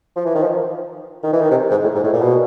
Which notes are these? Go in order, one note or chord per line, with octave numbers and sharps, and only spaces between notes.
F3
E3
D#3
F3
D#3
E3
D#3
C3
G#2
A2
G#2
A2
A#2
B2